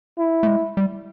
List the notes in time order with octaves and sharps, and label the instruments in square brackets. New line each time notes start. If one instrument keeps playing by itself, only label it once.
[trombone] E4
[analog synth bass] A3
G#3
G3